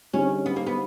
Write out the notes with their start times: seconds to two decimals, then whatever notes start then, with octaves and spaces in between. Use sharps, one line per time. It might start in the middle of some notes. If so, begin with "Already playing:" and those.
0.13 D3 G3 C4 C#4 D#4 G#4
0.46 B3
0.56 A#3
0.67 B3